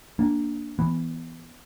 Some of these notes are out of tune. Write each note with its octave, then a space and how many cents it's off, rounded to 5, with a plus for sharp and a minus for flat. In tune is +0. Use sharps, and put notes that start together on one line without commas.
A#3 +5 D4 +0
E3 +0 B3 +0